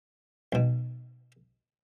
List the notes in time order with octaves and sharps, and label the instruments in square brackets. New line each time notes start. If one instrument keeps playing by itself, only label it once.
[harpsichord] B1 B2